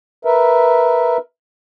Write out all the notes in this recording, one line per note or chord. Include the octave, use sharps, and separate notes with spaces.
A#4 B4 E5